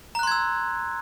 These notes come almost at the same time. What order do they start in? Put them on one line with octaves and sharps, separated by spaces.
A#5 F#6 C6 G#6 E6